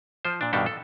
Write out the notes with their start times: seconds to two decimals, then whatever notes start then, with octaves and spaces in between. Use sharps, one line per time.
0.25 F3 C5
0.41 A#2 D4
0.53 G2 B2 D#3 D4 G4 A4
0.66 A4